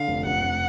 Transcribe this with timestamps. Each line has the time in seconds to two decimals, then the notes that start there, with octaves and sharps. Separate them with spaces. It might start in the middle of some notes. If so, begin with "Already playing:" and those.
Already playing: D3 F5
0.08 F1
0.25 F1 F#5
0.43 F1